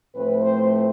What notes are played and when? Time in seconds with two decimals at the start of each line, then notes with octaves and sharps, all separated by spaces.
0.14 A2 F3 A3 C4 B4
0.43 C5